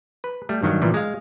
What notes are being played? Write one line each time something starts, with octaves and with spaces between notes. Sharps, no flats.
B4
G3 A3
G2 D#3 F#3 G3
A#2 E3 G3
G#3 F5